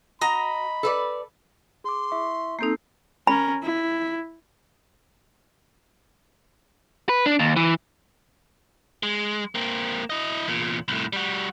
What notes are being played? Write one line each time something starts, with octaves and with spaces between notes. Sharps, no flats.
F#4 D#5 A#5 B5
A4 B4 D5
G#4 C6 D6
E4 E5 C#6
A#3 C4 D#4 A4 G6 C7
C#4 A#4 B5
E4
B4
D4
D#2
E3
G#3
A#3 C4
E4 D#5
E2 A#2
C2 A2
G3 F#4